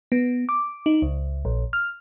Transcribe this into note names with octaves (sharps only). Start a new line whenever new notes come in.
B3
D6
D#4
C#2
A#1
F6